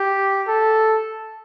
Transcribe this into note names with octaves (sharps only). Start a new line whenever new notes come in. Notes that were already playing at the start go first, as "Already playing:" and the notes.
Already playing: G4
A4